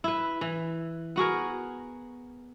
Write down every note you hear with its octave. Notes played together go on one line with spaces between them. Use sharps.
E4 B4
E3
B3 F#4 G#4 A#4